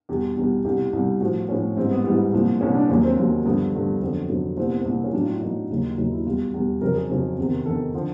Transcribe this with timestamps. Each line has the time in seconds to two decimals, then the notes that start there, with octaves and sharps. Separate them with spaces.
0.09 E2 B2 G3 G4
0.36 E2 B2 G3
0.65 C2 B2 G3 G4
0.93 C2 B2 G3
1.21 A2 F3 F#4
1.48 A2 F3 C#4
1.77 G#2 E3 G3 C4
1.91 B3
2.04 G#2 E3 G3 B3
2.33 C2 A#2 F3
2.61 C2 A#2 F3 C#4
2.74 D4
2.89 D#2 D#3 F#3 C#4
3.03 C4
3.17 D#2 D#3 F#3
3.45 G2 D3 F3 B3
3.73 G2 D3 F3
4.01 F2 D3 F#3 B3
4.29 F2 D3 F#3
4.57 C2 A#2 G3 C4
4.67 B3
4.77 C4
4.85 C2 A#2 G3
5.04 C#4
5.13 A2 F#3 D4
5.23 F4
5.32 E4
5.42 A2 F#3 D#4
5.70 D#2 C#3 F#3
5.97 D#2 C#3 F#3 D#4
6.12 E4
6.25 E2 B2 G3 F4
6.54 E2 B2 G3
6.81 F2 C#3 F#3 A#4
6.96 G#4
7.09 F2 C#3 F#3
7.38 E2 C3 D#3
7.65 E2 C3 D#3 A4
7.94 D3 F3